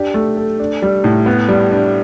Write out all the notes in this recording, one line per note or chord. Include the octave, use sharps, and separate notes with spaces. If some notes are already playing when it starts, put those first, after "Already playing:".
Already playing: D4 G4
A3
A4
D4
G3
A2
B3
G3
D4